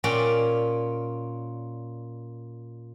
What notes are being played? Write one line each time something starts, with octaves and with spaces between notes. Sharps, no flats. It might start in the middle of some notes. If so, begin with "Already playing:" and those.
A#2 C#4 D5